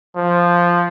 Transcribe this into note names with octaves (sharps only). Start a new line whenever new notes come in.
F3